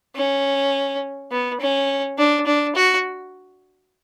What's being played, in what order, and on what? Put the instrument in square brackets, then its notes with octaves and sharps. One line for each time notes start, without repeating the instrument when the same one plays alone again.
[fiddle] C#4
B3
C#4
D4
D4
F#4